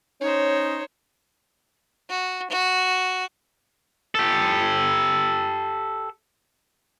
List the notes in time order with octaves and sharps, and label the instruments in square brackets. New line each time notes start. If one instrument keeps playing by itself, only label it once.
[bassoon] C#4 [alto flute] D#4 [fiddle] C5 C#5
[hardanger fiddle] F#4
F#4
[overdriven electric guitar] G4 A4